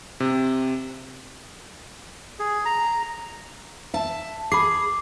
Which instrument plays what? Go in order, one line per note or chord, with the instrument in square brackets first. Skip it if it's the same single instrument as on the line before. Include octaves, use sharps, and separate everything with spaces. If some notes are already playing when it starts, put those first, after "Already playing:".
[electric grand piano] C3
[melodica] G#4
A#5
[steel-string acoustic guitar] E5 A5
[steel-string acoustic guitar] G#4 [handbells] B5 C7 [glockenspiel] D6